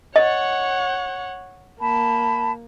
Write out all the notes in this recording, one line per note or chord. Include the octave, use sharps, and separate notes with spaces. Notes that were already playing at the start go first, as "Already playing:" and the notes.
C#5 D#5 F#5
A#3 A5 B5